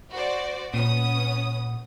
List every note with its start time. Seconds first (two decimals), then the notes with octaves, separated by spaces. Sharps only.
0.11 F#4 C5 D5
0.74 A#2 B3 C#4 D#6